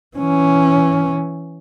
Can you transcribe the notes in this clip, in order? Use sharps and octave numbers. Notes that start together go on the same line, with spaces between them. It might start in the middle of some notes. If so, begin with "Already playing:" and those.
E3 C#4